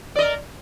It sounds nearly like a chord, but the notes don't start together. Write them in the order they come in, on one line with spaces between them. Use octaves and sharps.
D5 D#5 A#4